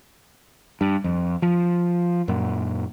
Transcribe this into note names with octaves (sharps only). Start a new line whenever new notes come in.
G2
F2
F3
F#2 A#2